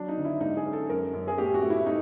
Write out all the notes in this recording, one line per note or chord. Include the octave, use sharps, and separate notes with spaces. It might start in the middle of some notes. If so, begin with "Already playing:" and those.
Already playing: F#3 D4
D#4
D3
E4
G#2 D#4
G#4
C#4
A4
F#2 A#4
F#2
G#4
A2 G4
F#4
A3
E4
A3 D#4